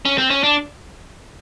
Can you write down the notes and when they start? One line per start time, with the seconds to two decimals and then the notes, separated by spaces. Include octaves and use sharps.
0.05 C#4
0.18 C4
0.30 C#4
0.44 D4